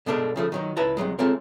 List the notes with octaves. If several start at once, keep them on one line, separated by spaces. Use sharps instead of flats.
B2 G#3 A3 D4 A4 A#4
C#3 F3 A3
D#3 F#3 D#4
C#2 E4 B4 A5 A#5
C2 G2 F#3 G#3
G#3 A3 C4 F4 A#4 C#5